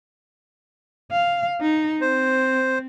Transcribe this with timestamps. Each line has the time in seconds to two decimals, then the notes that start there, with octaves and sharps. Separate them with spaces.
1.12 F5
1.61 D#4
2.01 C4 C5